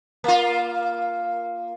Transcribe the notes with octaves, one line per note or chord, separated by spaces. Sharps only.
A#3 F4